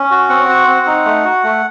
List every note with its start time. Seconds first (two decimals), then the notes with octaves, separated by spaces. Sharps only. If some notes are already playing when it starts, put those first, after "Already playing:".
Already playing: C#4
0.11 F#4
0.29 C4 F#5
0.48 F#4
0.68 C4
0.87 D#4
1.05 A3
1.25 F#4
1.44 A3